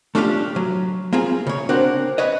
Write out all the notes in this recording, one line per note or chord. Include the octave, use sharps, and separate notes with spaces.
A3 C#4 D4 F4 G4 F5
F#3
A#3 C4 F4 G#4
C#3 C#5
C4 D4 F#4 A#4 C5 F#5
B4 C#5 D#5